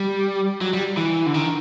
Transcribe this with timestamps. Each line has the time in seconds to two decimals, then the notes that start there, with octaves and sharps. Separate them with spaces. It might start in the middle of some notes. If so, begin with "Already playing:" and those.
Already playing: G3
0.61 F#3
0.73 G3
0.97 E3
1.26 D3
1.34 D#3